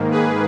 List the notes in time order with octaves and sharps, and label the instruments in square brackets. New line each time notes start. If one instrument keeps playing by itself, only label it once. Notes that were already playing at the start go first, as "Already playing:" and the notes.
Already playing: [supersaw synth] G#2 D#3 A#3
G#4 B4